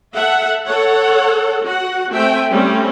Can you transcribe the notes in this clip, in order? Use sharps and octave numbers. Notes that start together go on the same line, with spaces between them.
A4 E5 F#5
A4 C#5 F#5
F#4 F#5
A3 C4 E5 G5 G#5
G3 A3 C4 C#4